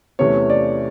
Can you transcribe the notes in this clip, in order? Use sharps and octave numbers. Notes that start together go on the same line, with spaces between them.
E2 C3 E3 A3 C#4 C#5
D5